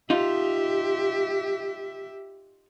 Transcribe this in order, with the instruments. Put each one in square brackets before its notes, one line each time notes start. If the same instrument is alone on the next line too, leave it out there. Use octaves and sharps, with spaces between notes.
[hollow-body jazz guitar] D#4 F4 [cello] G4 E5